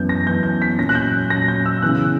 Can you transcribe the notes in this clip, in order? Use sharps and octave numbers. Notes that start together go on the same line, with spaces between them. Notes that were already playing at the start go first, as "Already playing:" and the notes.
Already playing: F#2 E3 B3 G6
A#6
F#2 E3 B3 G6
G6
B6
A#2 F#3 C#4 A#6
F#6
G6
A#2 F#3 C#4 A#6
G6
E6
C#3 E3 B3 F#6